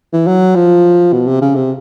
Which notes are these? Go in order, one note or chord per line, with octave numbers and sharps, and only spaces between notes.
E3
F#3
F3
B2
C3
C#3
C3